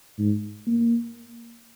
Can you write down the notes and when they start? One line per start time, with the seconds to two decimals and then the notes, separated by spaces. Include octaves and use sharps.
0.19 G#2
0.67 A#3